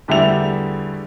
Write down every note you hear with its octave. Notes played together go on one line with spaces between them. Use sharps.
E2 D3 G3 A3 E4 F7